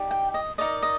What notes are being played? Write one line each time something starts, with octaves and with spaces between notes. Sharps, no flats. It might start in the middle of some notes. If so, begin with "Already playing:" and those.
Already playing: D#4 G4 D5
G5
D#5
D#4 A#4 D5 D#5
D#5